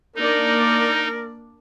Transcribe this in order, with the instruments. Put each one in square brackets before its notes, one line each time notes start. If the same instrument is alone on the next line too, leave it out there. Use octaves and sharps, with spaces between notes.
[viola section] A#3 D4 D5 [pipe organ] D#4 [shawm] A#4